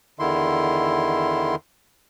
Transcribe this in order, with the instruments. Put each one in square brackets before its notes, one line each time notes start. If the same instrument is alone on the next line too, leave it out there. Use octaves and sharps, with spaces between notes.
[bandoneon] E2 D3 D#3 E4 C6